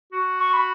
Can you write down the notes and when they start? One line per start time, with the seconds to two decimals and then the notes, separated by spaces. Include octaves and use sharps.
0.13 F#4
0.40 C#6
0.54 B5